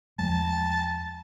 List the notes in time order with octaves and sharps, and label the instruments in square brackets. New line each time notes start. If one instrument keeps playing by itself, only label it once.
[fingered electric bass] E2 F3 G#3 [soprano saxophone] A5